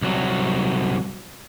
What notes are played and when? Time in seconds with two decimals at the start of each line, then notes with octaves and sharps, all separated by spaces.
0.02 C2 F#3